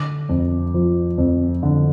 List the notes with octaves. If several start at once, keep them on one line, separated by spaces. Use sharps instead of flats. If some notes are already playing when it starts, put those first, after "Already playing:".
Already playing: D3 D6
F2
F3
F2
D3